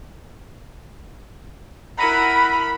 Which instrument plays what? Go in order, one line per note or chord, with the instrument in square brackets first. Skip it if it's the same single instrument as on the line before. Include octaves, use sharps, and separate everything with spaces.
[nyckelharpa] E4 A#4 [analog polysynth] F#5 A#5 D#7 [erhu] B5